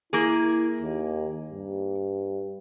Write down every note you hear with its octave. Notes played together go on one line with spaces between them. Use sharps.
A#3 E4 G#4
D#2
G2